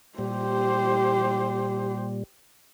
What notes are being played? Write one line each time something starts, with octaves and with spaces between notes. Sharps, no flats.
A#2 G3 G4 C5